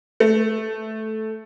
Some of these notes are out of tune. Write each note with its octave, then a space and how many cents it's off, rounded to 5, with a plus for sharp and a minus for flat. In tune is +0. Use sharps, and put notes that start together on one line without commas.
A3 -10